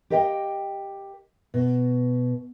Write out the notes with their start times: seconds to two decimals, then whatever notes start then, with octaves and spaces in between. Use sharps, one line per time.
0.10 G4 A#4 D#5 F5 G5
1.54 B2